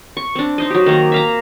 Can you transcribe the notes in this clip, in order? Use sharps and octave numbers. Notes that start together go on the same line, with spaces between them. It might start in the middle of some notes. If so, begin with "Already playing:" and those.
C#6
C4 D4
D#4 C5 D#5
F#3 G4
D#3 A#3 A#5
E5 F5 A#5